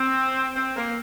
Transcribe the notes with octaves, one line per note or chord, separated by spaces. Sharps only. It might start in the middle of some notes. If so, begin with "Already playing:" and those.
Already playing: C4
C4
A#3